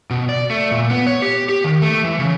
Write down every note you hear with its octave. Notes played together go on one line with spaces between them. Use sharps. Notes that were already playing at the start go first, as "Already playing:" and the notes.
B2
D5
A3
A#2
B3
C#5
G4
G4
D#3
A3
E3
C#3